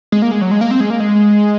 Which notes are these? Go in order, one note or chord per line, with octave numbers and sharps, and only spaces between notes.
G#3
A#3
G#3
F#3
G#3
A#3
C4
G#3
A#3
G#3